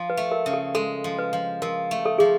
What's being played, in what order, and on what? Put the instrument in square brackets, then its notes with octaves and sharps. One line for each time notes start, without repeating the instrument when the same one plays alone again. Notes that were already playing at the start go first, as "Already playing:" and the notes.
Already playing: [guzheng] F3
[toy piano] B4
[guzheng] A3
[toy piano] A#4
[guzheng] C#3
[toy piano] A4
[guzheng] G#3 [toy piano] A4
[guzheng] F3
[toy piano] B4
[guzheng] F3
[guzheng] F3 [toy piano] A#4
[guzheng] A3
[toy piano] A4
[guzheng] F3 [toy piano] G#4